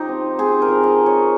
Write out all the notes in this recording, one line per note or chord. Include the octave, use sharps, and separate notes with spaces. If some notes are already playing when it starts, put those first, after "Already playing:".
Already playing: F3 D#4 G4
C4
C4 G#4
A#4
F3
D#5
F3
C#5